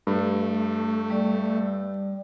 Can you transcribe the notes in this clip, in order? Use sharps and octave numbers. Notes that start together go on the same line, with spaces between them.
G2 A3
G3 D5